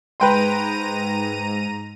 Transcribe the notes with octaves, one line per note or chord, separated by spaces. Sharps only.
G#2 B4 G5 A#5 C6 D#7